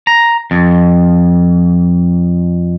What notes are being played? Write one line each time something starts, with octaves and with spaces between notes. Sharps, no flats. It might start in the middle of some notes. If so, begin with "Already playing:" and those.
A#5
F2